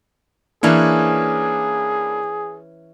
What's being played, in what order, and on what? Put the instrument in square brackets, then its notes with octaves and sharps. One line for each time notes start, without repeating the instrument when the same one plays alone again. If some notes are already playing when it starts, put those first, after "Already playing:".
[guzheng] E3 C#4 C#5 [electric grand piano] A#3 D4 E4 [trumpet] G#4